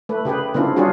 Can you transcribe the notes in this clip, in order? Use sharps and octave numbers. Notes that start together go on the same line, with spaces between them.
A3 B4
C#3 G4 G#4 B4
C#3 A#3 C4 D4 E4 F4
G3 C#4 D4 F4 F#4 G#4